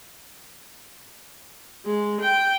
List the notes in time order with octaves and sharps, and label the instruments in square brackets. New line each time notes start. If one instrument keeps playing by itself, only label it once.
[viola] G#3
G5